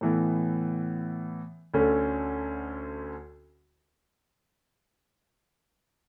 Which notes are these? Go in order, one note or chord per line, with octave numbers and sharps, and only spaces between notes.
A2 E3 B3
D2 D3 A3 C#4